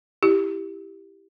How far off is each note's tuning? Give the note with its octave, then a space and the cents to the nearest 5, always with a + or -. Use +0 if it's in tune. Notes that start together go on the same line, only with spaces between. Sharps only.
E4 +0 G4 +0